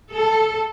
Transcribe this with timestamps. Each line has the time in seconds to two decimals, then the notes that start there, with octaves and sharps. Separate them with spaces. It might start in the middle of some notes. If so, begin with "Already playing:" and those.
0.11 A4